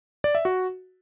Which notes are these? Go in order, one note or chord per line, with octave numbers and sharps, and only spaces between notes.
D5
E5
F#4